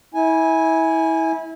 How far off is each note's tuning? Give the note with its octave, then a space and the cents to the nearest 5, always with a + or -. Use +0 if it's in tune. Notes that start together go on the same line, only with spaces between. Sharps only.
E4 -25 G#5 +0